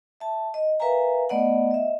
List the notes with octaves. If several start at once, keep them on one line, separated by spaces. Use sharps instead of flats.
E5 A5
D#5
A#4 B4 E5 F5 G#5 A#5
A3 B3 D5 D#5 F#5
D#5 E5